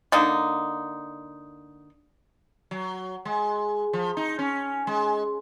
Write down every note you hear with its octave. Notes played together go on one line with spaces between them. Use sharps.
D3 A#3 D#4
F#3
G#3
F3
D#4
C#4
G#3